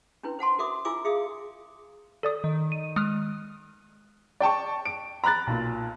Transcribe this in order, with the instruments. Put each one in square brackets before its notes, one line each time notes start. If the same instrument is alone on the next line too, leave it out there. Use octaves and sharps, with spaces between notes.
[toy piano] C#4 D4 E4 B4
C5 F#5 A5 C6
F#4 A#4 E5 D6 D#6
E4 F4 E5 G#5 D6 E6
G#4 E5 F5 D#6
[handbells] A4 D5 D#6
[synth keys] D#3
[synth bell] D#7
[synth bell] G#3 [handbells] D#6 F6
[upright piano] D5 G5 A5 C#6
D7
A#5 B5 F#6 A6
B1 A#2